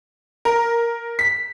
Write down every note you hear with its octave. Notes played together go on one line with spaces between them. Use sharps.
A#4
B6